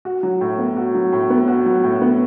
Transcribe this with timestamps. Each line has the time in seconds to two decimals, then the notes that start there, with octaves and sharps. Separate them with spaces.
0.05 F#4
0.23 F#3
0.41 A2
0.58 B3
0.77 F#4
0.95 F#3
1.12 A2
1.30 B3
1.48 F#4
1.66 F#3
1.84 A2
2.01 B3